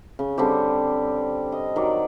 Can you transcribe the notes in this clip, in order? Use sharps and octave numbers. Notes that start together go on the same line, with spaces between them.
C#3
D3 G3 C4 G4
D#5
D#3 F#3 D5